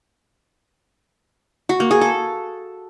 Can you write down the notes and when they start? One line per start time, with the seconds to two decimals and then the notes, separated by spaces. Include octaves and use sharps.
1.69 F#4
1.80 A#3
1.91 G#4
2.01 A4